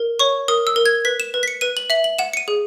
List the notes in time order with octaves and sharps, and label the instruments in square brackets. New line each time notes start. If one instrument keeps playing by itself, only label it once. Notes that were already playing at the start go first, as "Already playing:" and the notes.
Already playing: [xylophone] A#4
C#5 C#6
A#4 D#6
E6
A#4
G#6
B4 B6
E7
B4
B6
C#7
B4 D#7
F#7
E5 F#7
F#7
F#5 E7
C#7
D#7
G#4